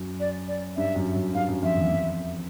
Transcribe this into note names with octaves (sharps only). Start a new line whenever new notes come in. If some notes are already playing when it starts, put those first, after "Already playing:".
Already playing: F#2
D5
D5
G2 E5
F#2
F#2
G2 F5
F#2
F2 E5
E2
F2